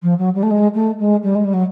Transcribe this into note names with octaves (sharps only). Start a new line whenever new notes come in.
F3
F#3
G3
A3
G#3
A3
G#3
G3
G#3
G3
F#3